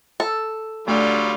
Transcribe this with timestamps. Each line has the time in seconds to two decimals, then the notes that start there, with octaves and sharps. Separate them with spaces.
0.20 A4
0.88 D3 F#3 G3 A3 F4